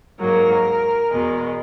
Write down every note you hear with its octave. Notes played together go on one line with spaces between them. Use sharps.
G#2 F#3 A#3 A#4
E2 B2 G#3